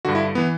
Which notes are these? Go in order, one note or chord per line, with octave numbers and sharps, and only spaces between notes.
G2 D3 F#4
E4
E3 B3